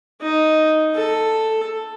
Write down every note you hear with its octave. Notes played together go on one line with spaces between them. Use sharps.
D#4
A4